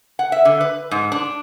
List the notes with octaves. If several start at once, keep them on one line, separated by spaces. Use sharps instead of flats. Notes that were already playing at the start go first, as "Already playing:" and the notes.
F#5
E5
D3
B4
G#2
D4